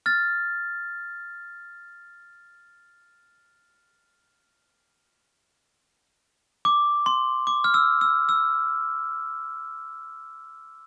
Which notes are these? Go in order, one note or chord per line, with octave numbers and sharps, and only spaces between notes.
F6 A6
D6
C6
D6
F6
E6
E6
E6